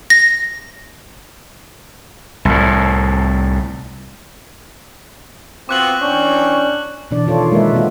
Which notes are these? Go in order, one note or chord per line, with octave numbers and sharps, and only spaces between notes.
A#6
C2 A2
B3 C4 F4 F#4 D6 F#6 F#7
E3 C#4 D4 G5 C#6
B2 E3 D4 D5
D#3 F4 A4 C#5
G#3 A#3 A#4 B4 E5
C3 A#3 C4 F4 F#4 E5